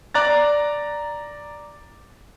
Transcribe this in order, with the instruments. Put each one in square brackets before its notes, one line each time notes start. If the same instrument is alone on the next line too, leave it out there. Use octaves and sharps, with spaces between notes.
[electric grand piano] D5 A#5 F#6 A6